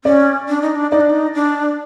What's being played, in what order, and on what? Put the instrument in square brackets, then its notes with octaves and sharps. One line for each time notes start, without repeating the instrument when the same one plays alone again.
[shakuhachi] C#4 [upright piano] D5
[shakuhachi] D4
D#4
D4
[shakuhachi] D#4 [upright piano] D5
[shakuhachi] D4
D#4
D4